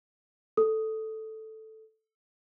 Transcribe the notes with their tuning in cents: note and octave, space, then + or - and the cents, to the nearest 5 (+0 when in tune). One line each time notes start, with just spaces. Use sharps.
A4 +0 D#6 +0